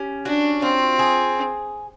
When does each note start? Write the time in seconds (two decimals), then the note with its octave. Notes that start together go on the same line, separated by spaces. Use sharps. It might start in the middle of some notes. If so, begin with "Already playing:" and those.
Already playing: C#4 G4
0.25 D4 F#4
0.62 C4 F4
0.99 G#4